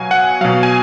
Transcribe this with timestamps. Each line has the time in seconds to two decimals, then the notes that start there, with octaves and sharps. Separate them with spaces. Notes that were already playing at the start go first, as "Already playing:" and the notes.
Already playing: B2 F#3 F5 G#5
0.11 F#5
0.41 B2 F#3 F5
0.63 G#5